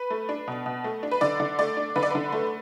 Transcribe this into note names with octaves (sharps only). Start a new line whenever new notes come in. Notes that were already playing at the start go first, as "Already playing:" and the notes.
Already playing: B4
A3
D4
B2
B2
A3
D4
B4
D3 D5
D3
A3 D5
D4
D3 B4
D5
D3 B4
A3